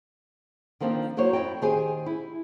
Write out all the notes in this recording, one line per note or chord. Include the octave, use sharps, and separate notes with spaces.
D#3 F3 A#3 C4 D4 F4
F#3 A#3 E4 C5 C#5
F2 E4 D#5 G5
D#3 G4 G#4 C5 G#5
E4